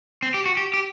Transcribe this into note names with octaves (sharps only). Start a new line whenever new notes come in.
C4
G4
F#4
G4
G4